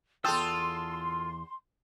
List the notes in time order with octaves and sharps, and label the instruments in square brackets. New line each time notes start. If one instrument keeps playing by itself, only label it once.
[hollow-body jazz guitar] E2 G5 [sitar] F4 A4 [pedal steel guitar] A5 D#6 E6 [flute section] C6